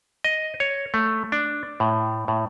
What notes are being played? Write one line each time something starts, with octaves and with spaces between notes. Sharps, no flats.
D#5
C#5
A3
D4
A2
A2